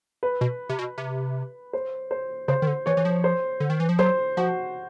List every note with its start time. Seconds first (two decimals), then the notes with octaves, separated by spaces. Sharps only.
0.23 B4
0.41 B2
0.69 C3
0.79 B2
0.98 C3
1.73 C5
2.11 C5
2.48 C#3 C5
2.62 D#3
2.67 D3
2.86 E3 C#5
2.97 E3
3.05 F3
3.24 C5
3.60 D3
3.70 D#3
3.80 E3
3.89 F3
3.99 F#3 C5
4.37 F3 F#4